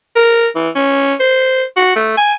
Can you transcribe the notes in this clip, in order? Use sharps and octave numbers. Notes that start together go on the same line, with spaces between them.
A#4
E3
C#4
C5
F#4
A3
G#5